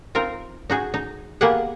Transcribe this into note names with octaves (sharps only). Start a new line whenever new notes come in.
C4 D#4 F4 A#4
D#4 F#4 G#4
D#4
A#3 B3 G4 G#4 B4 F#5